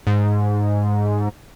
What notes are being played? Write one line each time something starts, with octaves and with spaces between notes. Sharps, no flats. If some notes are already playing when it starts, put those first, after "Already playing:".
G#2